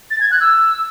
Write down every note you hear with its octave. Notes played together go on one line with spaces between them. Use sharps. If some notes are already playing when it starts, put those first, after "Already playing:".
A6
G#6
F#6
E6